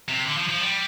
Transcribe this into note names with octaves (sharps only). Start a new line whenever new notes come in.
C3
D3
F3
F3
G3